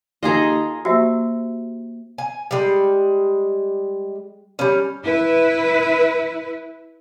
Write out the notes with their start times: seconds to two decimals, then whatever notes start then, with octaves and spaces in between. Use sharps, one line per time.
0.23 D#2 F4 G#4 A4 D#5 G#5 A#5
0.85 A#3 F#4 G4 C5 E5 E6
2.18 G#5
2.51 G3 G#3
4.59 G3 C#4
5.04 E4 B4